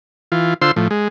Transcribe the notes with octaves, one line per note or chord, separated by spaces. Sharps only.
E3 F4
D3 F4 C5 C6 E6
A2 F3
G#3